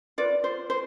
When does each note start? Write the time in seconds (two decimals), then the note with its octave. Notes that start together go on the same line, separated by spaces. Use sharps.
0.18 F4 B4 D5
0.44 C5
0.70 C5